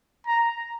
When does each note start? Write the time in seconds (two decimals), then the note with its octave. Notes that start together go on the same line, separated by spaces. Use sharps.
0.27 A#5